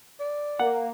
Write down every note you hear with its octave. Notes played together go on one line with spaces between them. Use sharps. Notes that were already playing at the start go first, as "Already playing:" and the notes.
D5
A#3 F#5